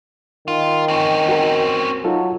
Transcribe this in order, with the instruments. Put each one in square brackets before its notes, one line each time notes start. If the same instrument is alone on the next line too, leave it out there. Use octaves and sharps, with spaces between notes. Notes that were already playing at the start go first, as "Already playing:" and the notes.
[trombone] D#3 [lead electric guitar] F4
[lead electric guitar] C4 C#4
[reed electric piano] F#4 A#4
[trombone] F#3 [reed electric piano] D#4 F4 A4